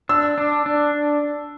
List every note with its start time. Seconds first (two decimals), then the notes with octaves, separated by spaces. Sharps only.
0.09 D4 E6
0.38 D4
0.66 D4